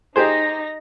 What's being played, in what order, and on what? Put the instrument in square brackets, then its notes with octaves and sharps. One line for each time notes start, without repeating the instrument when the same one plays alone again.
[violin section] D#4 A#6 [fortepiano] G4 G#4 C5